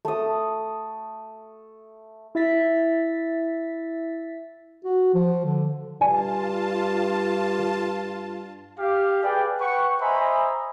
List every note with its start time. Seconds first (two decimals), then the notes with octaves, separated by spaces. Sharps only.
0.05 A3 D#6
2.35 E4 E5 A6 B6
4.85 F#4
5.14 F3
5.45 D3
6.01 G2 F4 D5 G#5 A5
8.79 G4 F5
9.23 G#4 B4 D5 G5
9.60 B4 F#5 G5 C#6
10.01 C5 D#5 E5 G#5 A#5 B5